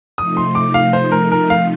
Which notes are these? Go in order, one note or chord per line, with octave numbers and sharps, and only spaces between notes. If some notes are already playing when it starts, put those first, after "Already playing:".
C3 F3 A3 D#4 D#6
C6
D6
F5
C5
A#4
A#4
F5